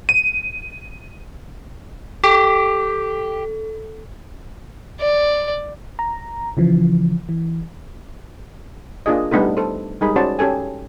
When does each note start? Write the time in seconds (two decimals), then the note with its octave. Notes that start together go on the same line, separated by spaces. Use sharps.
0.09 D#7
2.24 G4 A4
5.00 D5
5.99 A#5
6.57 C#3 E3 F3
7.29 E3
9.06 A#3 D4 F4 G#4 D#5
9.31 G3 A3 B3 D4 D#4 A4
9.57 A4 C5
10.01 G3 G#3 D#4 G#4 A#4 B5
10.16 C#4 F#4 C5 D5 A5
10.39 C#4 G4 A4 G#5